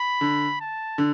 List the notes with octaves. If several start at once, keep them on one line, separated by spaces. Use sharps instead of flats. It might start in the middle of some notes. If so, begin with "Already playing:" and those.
Already playing: B5
D3
A5
D3